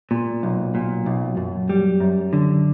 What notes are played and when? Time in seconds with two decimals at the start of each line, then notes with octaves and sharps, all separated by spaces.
0.11 A#2
0.43 B1
0.75 A#2
1.06 B1
1.37 F#2
1.69 G3
2.00 F#2
2.33 D3